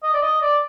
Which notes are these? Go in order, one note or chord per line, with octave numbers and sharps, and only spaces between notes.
D#5
D5
D#5
D5